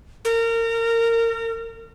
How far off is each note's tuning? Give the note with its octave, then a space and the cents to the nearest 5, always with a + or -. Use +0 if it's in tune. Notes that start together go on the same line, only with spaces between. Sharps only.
A#4 -25